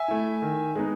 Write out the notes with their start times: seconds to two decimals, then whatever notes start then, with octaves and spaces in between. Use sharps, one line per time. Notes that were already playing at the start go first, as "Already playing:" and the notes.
Already playing: E5 G#5
0.08 A3 E4
0.42 D#3
0.75 G#3 B3 D#4